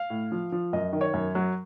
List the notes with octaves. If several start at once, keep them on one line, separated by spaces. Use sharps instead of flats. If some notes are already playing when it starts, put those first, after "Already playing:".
Already playing: F5
A2
F3
F3
F#2 D#5
D#3
C#5
F#2
F#3